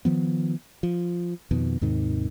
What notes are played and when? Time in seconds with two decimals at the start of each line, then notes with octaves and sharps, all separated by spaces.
0.05 D#3 F3 B3
0.83 F3
1.51 F2 B2 D#3
1.81 D#2 G#2 C3 D#3